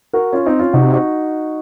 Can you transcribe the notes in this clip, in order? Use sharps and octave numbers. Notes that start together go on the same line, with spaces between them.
F#4 A#4
C#4 F4
C4 D#4
C#4 F4
C3 D#4 F#4
D#4 F#4